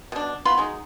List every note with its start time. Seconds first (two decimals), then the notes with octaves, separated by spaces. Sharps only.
0.12 B2 D4
0.45 B3 F4 B5 C6
0.58 F#3 G#3 D#4